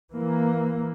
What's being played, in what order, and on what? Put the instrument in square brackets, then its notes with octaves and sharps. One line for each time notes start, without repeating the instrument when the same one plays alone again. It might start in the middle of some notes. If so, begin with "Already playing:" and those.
[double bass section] E3 A#3